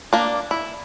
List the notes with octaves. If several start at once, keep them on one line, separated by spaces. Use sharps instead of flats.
A#3 D4
E4